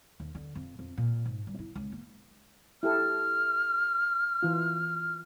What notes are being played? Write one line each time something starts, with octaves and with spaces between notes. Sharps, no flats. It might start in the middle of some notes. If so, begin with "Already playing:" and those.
D#2
D3
F2
F2
A#2
G#2
G2
E4
C#2
A#3
E4 G4 A4 F6
E3 F4